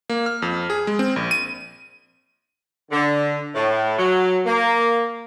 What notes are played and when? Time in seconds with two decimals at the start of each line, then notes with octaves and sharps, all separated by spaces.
0.09 A#3
0.26 F6
0.42 F2
0.70 G#4
0.87 G#3
0.99 C4
1.16 A#1
1.31 D#7
2.91 D3
3.55 A2
3.98 F#3
4.46 A#3